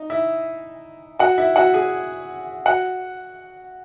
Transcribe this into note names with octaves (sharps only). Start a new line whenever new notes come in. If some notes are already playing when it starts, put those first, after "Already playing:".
Already playing: D#4 D#5
E4 E5
F#4 F#5
E4 E5
F#4 F#5
G#4 G#5
F#4 F#5